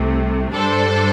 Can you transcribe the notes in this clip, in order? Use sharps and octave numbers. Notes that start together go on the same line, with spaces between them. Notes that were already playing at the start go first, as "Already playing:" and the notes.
Already playing: C2 C3 A3
G2 G3 D4 A4 C5